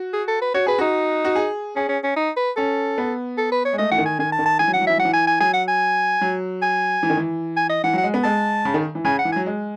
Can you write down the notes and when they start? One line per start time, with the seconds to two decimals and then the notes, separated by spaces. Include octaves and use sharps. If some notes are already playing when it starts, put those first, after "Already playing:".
Already playing: F#4
0.13 G#4
0.28 A4
0.42 B4
0.54 F#4 C#5
0.66 G#4 B4
0.78 D#4 F#4
1.25 F#4
1.35 G#4
1.76 C#4 G#4
1.89 C#4
2.03 C#4
2.16 D#4
2.37 B4
2.56 C#4 A4
2.98 B3
3.38 A4
3.52 B4
3.65 C#5
3.73 G#3
3.78 A3 D#5
3.91 E3 F#5
3.98 D#3
4.06 G#5
4.19 D#3 G#5
4.32 A5
4.39 D#3
4.46 A5
4.59 E3 G#5
4.68 F#3
4.73 E3 F#5
4.81 F#3
4.87 E3 E5
4.97 F#3 F#5
5.05 E3
5.13 G#5
5.27 G#5
5.40 F#3 G#5
5.54 F#5
5.68 G#5
6.21 F#3
6.62 G#5
7.03 E3
7.10 D#3
7.17 E3
7.57 G#5
7.69 D#5
7.84 E3 F#5
7.93 F#3
7.98 F#5
8.03 G#3
8.14 B3
8.23 G#3 A5
8.65 C#3
8.74 D#3
8.95 E3
9.05 C#3 G#5
9.19 F#5
9.25 E3
9.32 F#3 G#5
9.46 G#3